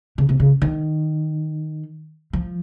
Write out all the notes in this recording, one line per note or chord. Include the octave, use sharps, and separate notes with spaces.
C#3
C3
C#3
D#3
F3